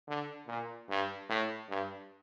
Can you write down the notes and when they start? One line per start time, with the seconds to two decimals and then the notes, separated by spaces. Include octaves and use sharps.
0.08 D3
0.48 A#2
0.89 G2
1.29 A2
1.69 G2